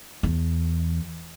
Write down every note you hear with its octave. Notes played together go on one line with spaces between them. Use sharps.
E2